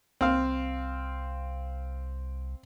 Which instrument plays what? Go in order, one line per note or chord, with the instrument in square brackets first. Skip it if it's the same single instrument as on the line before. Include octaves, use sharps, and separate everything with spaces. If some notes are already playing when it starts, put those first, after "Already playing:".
[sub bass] C2 [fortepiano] C4 F5